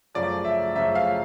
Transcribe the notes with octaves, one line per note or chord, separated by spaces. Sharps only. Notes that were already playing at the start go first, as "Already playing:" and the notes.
F#2 C#3 F3 A3 D5
E5
F#2 C#3 F3 A3 E5
F5